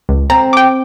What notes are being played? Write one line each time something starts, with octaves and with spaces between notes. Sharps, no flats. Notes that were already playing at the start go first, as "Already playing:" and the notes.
C#2
C4 A#5
G5 D6